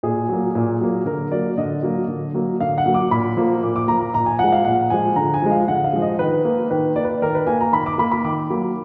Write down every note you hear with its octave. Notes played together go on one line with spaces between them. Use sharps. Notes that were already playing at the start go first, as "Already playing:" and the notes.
A#2 G#4
F#3 A#3
A#2
F#3 A#3
D3 A#4
F#3 A#3 D5
D3 D#5
F#3 A#3
D3
F#3 A#3
D3 F5
F#5
F#3 A#3
D6
A#2 B5
F3 A#3
A#2 D6
D6
F3 A#3 A#5
A#5
A#2 A#5
G#5
F3 G#3 F#5
F5
A#2 F#5
F3 G#3 G#5
D3 A#5
G#5
F3 G#3
F5
D3 F#5
F5
F3 G#3
D#5
D#3 B4
A#3
D#3 B4
A#3 D5
B4
D#3 A#4
B4
A#3 G#5
A#5
D#3 B5
D6
A#3 B5
B5
D#3 D6
F#3 A#3